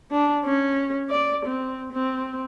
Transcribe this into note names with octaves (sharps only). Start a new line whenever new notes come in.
D4
C#4
D5
C4
C4